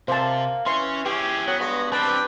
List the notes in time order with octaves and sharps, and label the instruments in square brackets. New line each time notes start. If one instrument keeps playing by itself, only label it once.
[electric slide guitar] C3 [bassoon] A#3 [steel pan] C5 A5
[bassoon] E3 [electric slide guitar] C#4 C#5 [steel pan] C6
[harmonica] C#4 [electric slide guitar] E4 G#4 [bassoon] G4
[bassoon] F#3 [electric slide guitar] B3
[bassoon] G2 [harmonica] G#3 F#4
[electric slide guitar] C4 D4 [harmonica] G4 G5 [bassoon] B4 [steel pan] A5